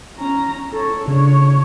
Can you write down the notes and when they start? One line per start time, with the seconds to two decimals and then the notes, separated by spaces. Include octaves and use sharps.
0.18 C#4 A#5
0.71 A4 C#5
1.08 C#3 D4 C#5